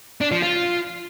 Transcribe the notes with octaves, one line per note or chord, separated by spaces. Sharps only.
D4
F3
F4